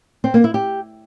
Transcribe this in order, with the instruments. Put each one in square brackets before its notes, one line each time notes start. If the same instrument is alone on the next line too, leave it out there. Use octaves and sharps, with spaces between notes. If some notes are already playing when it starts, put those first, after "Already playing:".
[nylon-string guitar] C4
A#3
E4
G4